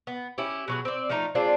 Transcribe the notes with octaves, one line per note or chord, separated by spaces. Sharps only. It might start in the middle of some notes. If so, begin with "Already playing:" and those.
B3
C#4 E4 G4
B2 F#3 G#4
C4 D5
F3 A3 D#4 A#5
G#3 C4 D4 F4